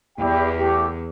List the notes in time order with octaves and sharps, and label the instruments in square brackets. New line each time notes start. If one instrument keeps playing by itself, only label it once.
[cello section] E2 [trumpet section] E4 G4 D5 G5
[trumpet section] A3 E4 G4